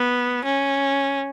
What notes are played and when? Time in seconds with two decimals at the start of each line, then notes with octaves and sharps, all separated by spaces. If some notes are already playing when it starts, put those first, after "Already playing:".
Already playing: B3
0.45 C#4